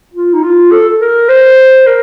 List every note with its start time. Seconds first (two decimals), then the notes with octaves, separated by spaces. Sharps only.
0.14 F4
0.33 D#4
0.43 F4
0.71 A4
1.00 A#4
1.29 C5
1.86 A#4